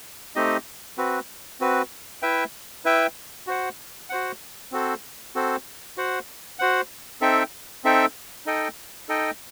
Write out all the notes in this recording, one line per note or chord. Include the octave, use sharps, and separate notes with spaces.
A3 C4 D#4 G4 D#5
C4 F#4 B4
C4 F#4 B4
E4 B4 E5 G5
E4 B4 E5 G5
F#4 C5 F#5
F#4 C5 F#5
C4 F#4 A4 C5
C4 F#4 A4 C5
F#4 C5 F#5
F#4 C5 F#5
C4 D#4 A4 E5 G5
C4 D#4 A4 E5 G5
D#4 A4 D#5 G5
D#4 A4 D#5 G5